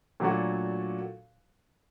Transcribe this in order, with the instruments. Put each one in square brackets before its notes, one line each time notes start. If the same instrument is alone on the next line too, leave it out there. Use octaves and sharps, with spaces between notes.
[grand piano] A#2 F#3 A3 D4 F#4